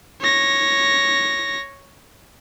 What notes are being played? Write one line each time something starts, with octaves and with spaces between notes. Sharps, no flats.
C#5 A#6